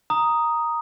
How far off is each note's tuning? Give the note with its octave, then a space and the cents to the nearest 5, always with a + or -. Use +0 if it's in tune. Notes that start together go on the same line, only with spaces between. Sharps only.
A#5 +0 D#6 +0